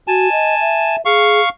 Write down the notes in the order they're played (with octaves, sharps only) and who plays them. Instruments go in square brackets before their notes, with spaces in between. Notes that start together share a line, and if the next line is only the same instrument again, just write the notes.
[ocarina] F#4 [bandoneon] G#5 A5
[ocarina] D#5
E5
[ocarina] G#4 [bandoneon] F5 C#6